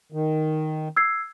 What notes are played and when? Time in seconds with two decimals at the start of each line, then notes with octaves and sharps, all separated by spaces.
0.12 D#3
0.97 E6 G#6 C7